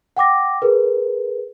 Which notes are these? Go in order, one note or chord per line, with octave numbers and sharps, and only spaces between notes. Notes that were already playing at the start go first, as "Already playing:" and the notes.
F#5 G5 D6 A#6
G#4 A#4 B4